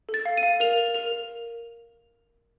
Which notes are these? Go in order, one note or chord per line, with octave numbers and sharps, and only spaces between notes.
A4
A6
F5
D#7
F5
A#4 F7
A#4
A#4 F7
A#4